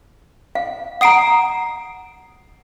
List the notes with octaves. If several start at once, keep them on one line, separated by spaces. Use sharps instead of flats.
F5
F#5 A#5 D#6 C7 D7